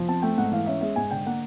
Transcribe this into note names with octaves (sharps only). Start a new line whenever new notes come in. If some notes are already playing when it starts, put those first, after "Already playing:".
Already playing: F3
C4 A5
A3 G5
G#2 F#5
E3 F5
C#4 E5
G#3 E5
G#2 G#5
D3 G5
A#3 F#5